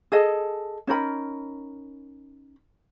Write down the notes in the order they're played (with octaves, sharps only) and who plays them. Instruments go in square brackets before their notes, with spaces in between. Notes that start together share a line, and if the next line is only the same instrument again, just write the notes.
[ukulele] G#4 A4 D#5
C#4 D#4 A#4 B5